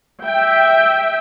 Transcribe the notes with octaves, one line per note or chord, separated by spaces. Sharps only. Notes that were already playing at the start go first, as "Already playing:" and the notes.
E5 G5